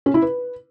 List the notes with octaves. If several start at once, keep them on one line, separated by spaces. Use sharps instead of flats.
C#4
E4
B4